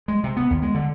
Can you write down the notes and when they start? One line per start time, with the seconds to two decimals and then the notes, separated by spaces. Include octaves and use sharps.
0.08 G#3
0.24 C3
0.37 B3
0.50 D#2
0.62 G#3
0.75 D3